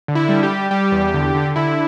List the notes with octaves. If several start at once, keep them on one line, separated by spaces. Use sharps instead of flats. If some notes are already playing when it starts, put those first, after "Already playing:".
D3
E4
G3
G4
G3
G3 G4
E2
D3
D3
D3 E4